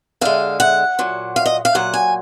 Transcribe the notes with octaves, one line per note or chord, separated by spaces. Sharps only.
D3 G#3 F5
F#5
A#2 F#3
F5
D#5
F5
A#2 F#3 F#5
G#5